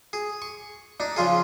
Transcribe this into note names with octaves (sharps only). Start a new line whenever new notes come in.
G#4
C#6
D4 D#4
C#3 F3 F4 G#4